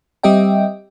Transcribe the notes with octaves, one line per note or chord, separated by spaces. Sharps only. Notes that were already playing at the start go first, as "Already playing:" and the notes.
G3 C4 G4 D#5 E5 G5